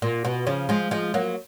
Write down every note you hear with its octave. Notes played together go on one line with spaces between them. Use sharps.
A#2
B2
C#3 F3
F3 G#3
F3 G#3
F#3 A#3